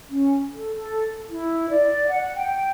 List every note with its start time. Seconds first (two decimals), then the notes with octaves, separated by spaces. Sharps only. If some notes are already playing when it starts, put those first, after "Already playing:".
0.10 C#4
0.50 A4
0.76 A4
1.30 E4
1.70 D5
2.09 F#5
2.36 G5